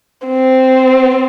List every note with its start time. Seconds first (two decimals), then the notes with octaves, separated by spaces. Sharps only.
0.27 C4